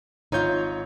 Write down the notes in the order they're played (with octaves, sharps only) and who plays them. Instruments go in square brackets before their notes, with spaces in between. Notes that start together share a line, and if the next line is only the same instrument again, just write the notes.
[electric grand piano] G#1 C#5 G6 [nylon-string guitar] D#4 F4